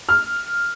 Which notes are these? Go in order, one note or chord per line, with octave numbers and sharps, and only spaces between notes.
F6